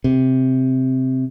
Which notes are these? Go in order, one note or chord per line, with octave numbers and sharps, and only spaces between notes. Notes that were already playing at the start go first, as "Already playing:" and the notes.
C3